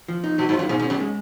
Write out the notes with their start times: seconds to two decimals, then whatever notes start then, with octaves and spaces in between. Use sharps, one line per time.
0.08 F3
0.24 D#4
0.38 B2 F#3
0.49 G#2
0.54 F4
0.59 F#2
0.69 G#2 B2
0.80 G#2
0.84 C#4
0.90 F#2
1.00 G#3